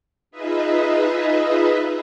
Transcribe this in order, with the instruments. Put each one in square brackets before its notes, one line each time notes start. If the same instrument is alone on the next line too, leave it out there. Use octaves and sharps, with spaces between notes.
[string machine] D#4 F4 G#4 B4 D#5 E5